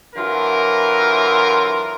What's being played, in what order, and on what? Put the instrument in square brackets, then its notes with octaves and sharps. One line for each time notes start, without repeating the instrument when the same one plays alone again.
[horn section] D3 E3 F#3 F4 A#4